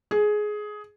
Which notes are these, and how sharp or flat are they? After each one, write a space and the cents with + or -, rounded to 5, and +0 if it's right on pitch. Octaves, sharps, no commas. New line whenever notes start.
G#4 +15